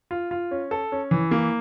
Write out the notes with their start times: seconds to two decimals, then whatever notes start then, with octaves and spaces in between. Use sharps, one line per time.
0.11 F4
0.31 F4
0.51 C#4
0.71 A4
0.92 C#4
1.11 E3
1.31 A#3